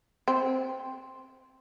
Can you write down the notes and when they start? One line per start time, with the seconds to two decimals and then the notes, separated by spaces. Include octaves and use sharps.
0.28 C4